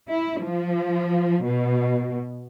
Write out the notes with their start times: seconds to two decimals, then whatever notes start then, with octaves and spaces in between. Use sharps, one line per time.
0.11 E4
0.43 F3
1.45 B2